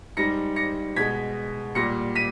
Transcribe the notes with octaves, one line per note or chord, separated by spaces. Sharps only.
G#2 G3 A#6 C#7
A#6 C#7
B2 G#3 G#6 B6
A#2 G3 A#6 C#7
B6 D#7